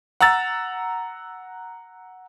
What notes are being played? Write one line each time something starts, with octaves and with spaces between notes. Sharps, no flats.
F#5 A#5 E6 A6